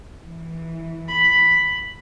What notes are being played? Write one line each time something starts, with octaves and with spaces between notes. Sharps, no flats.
E3
B5